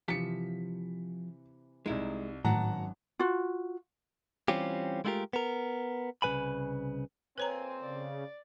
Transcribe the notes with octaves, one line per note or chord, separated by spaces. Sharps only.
C3 E3 F3 G4 A5 B6 C#7
C2 G#3 D#4 E4
G#1 F#2 A2 F#3 F#5 A5 A#5
F4 F#4
E3 G3 C4 C#4 F4 G4
G#3 A3 E4 F4 G4 A#4
B3 A#4
C2 C#3 E3 B4 G#5 B5
F2 A#3 C4 B4 C#5 G#5 A#5
C#3 D5